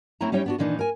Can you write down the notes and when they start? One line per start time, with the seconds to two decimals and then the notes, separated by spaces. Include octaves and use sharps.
0.21 A3 C4 C#4 E4 A#5
0.32 G3 C#4 D#4 E4 C#5 G5
0.46 B3 D4 F#4
0.58 A#2 D#3 E3 D4 D#4
0.79 A#4 G#5